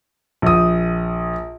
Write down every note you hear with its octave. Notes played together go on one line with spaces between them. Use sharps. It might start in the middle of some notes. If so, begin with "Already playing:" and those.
A#1 D#6